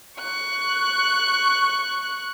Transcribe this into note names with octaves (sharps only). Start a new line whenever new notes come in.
C#6 F#6